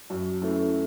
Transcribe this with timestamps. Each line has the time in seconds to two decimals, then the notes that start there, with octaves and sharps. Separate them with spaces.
0.10 F#2
0.42 E3 A3 C#4